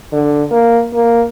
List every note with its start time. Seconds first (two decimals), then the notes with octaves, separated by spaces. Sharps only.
0.13 D3
0.51 A#3
0.93 A#3